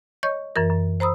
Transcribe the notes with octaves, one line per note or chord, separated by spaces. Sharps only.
C#5 D#5 C#6 G6
F#2 E3 A#4
F#2
C5 A#5 B5 D#6 E6